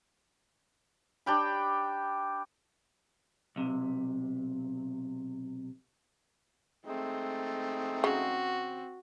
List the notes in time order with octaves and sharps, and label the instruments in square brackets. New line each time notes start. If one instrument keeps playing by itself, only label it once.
[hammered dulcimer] D4 G4 G5 B5
[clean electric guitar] B1 C3
[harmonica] G#3 A3 D#4 [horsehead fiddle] C4
[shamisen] C#3 [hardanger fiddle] F#4